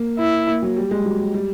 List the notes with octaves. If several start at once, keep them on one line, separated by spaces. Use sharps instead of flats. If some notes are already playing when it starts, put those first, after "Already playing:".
Already playing: A#3
E4
A#3
F#3
G3
G#3
F#3
G3
G3